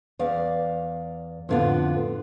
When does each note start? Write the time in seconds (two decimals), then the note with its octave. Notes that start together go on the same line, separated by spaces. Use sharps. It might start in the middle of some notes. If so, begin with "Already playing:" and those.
0.19 E2 D5 F5
1.49 F2 A2 D3 B3 F4